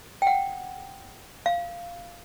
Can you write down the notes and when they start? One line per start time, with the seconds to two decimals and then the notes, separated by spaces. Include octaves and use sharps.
0.22 G5
0.27 F#5
1.46 F5